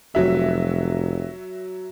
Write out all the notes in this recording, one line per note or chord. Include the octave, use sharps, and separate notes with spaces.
F1 F#3 E5